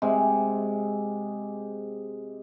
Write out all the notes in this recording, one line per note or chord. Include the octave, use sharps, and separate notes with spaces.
C3 G#3